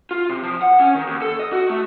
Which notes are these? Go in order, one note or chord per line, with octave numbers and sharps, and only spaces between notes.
F4
C3
F3
F#5
C#4
D#3
D#2
A4
D#5
F#4
A3